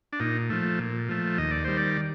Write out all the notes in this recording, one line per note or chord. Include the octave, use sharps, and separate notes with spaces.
D4
A#2 D#4
F3 A3
A#2
F3 A3
D#2 D#5
D5
D#3 G3 C5
D5